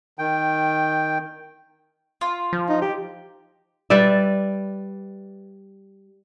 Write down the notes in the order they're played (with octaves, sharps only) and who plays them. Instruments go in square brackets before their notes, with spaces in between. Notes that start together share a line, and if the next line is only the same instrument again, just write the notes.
[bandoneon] D#3 G5
[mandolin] F4
[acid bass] F3
[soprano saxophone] D#4
G4
[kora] G3 B4 D5 E5